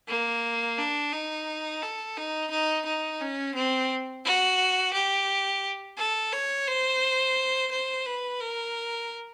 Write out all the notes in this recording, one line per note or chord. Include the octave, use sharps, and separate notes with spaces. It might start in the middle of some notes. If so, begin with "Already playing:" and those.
A#3
D4
D#4
A4
D#4
D#4
D#4
C#4
C4
F#4
G4
A4
C#5
C5
C5
B4
A#4